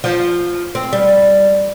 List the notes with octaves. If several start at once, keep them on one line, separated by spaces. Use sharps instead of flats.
F3
C4
G3